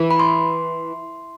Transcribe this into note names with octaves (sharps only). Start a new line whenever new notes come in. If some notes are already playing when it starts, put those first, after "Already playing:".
Already playing: E3
B5
C6